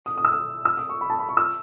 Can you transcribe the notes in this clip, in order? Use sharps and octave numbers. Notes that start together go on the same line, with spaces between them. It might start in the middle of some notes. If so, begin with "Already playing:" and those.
D#6
D#6
E6
D#6
E6
D#6
C#6
B5
A5
B5
C#6
E6